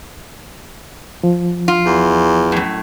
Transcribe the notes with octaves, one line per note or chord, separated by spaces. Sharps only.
F3
F4
E2
F#2 A2